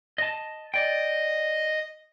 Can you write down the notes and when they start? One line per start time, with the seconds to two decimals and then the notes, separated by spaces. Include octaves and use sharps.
0.18 D#5 A5
0.74 D5 D#5 G5